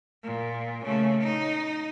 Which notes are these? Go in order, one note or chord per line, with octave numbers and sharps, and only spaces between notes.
A#2
C#3 A3
D#4